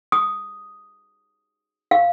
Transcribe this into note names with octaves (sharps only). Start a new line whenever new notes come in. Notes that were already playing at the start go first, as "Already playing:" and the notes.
D#6
F5